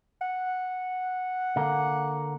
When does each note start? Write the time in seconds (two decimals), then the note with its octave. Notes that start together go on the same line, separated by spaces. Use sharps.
0.21 F#5
1.56 D3 A#3